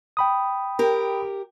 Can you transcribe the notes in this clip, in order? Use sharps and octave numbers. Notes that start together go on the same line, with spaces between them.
G5 B5 D#6
G4 A#4